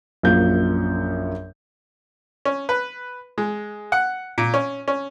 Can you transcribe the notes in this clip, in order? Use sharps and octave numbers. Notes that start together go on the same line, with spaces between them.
A#1 F#2 F4 G6
C#4
B4
G#3
F#5
A#2
C#4
C#4